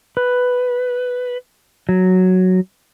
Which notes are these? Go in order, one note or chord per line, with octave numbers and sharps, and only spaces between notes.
B4
F#3